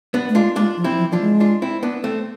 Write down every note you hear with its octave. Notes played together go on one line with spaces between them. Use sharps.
B3 D4
A3
G#3 D4 F4
G#3 D4 F4
F3
C4 E4
F3
F3 D4 F4
G#3
D4 F4
C4 E4
B3 D4
A3 C4